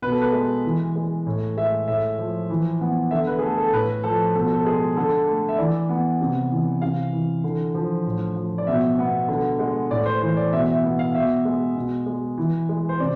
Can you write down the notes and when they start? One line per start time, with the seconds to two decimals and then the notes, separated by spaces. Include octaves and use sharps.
0.02 B2 B4
0.12 A4
0.21 B4
0.33 G#3
0.65 E3
0.96 G#3
1.26 A2
1.57 G#3 E5
1.88 A2 E5
2.18 F3
2.50 E3
2.81 B3
3.11 D3 E5
3.27 B4
3.39 G#4
3.42 A3 A4
3.58 A4
3.73 A2 B4
4.04 F3 A4
4.35 B2 A4
4.50 A4
4.65 G#3 G#4
4.96 D3 A4
5.27 A3
5.49 E5
5.58 E3 D5
5.89 B3
6.21 C3
6.52 E3
6.82 C3 F5
7.13 E3
7.44 D3
7.75 F3
8.06 A2
8.36 F3
8.58 D5
8.67 B2 E5
8.99 B3
9.28 D3
9.59 G#3
9.91 A2 D5
10.06 C5
10.22 E3 C5
10.37 D5
10.53 B2 E5
10.69 E5
10.84 B3
10.99 F5
11.14 B2 E5
11.45 G#3
11.76 B2
12.06 G#3
12.38 E3
12.69 G#3
12.89 C5
13.00 C3 D5